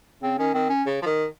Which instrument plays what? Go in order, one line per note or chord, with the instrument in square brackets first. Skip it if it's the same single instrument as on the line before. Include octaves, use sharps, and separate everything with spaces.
[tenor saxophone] C#3 [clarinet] C4
[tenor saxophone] D#3 [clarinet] C#4
[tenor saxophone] D#3 [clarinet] C4
[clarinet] C#4
[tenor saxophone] C#3
F3
D#3